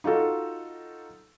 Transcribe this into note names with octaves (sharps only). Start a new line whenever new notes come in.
D#4 F4 F#4 A4